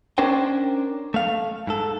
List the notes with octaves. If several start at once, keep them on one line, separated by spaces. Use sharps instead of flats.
C#4 D4 A#4 C5 G5
A3 F5
G#2 A4